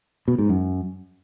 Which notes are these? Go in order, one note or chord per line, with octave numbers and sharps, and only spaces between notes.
B2
G#2
F#2